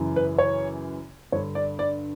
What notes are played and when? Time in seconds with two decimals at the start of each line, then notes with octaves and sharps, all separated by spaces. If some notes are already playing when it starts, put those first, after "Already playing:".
Already playing: F#2 C#3 E3
0.16 B4
0.38 C#5
1.32 G2 D3 C#5
1.55 D5
1.79 D5